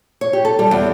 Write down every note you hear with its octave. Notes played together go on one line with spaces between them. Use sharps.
C#5
G4
A4
G3
E2